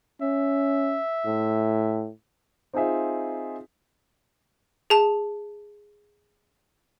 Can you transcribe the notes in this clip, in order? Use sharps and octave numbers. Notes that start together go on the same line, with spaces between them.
C#4 E5
A2
C4 D#4 F4 G#4 E5
G#4 A5